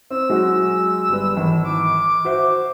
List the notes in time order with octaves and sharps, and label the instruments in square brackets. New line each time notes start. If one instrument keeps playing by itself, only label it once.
[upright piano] C4 [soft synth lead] E6
[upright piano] F#3 G#3 F#4
G1 G3 B4
[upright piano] G#1 [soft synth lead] E3
[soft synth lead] D6
[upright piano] F#4 C5 E5